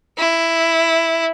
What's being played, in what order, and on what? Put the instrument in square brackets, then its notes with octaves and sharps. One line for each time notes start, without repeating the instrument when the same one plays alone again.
[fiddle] E4